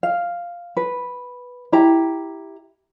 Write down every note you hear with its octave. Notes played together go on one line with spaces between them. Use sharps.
F5
B4
E4 G4 A#5